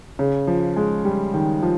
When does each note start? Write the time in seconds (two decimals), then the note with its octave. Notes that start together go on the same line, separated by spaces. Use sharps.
0.19 C#3
0.47 F3
0.76 G#3
1.05 G3
1.34 D#3
1.63 F3